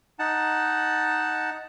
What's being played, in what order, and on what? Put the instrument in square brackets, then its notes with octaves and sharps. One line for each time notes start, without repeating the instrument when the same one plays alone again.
[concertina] D#4 F#5 A5